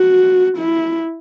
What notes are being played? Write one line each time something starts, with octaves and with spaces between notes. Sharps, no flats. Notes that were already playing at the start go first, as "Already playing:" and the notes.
Already playing: F#4
E4